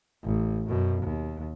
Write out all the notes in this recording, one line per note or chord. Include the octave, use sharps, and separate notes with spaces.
A1
F#2 B2
D#2